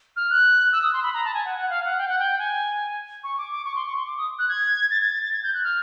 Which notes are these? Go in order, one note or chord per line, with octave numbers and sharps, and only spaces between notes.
F6
F#6
E6
D#6
C6
B5
A#5
A5
G#5
F#5
F#5
F5
F#5
G5
F#5
G5
G#5
C#6
D6
D6
C#6
C6
C#6
C6
D6
D#6
F#6
G#6
A6
G#6
A6
A6
G#6
G6
F#6
F6